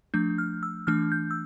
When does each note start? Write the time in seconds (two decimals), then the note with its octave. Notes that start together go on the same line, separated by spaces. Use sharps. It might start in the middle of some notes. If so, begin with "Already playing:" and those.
0.14 F3 A3 D4 G6
0.38 F6
0.63 E6
0.87 E3 A3 D4 F6
1.12 G6
1.31 E6